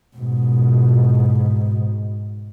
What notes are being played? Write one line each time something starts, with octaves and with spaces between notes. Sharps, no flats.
G#2 B2